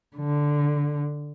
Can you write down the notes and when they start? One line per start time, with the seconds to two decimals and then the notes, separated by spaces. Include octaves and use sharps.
0.17 D3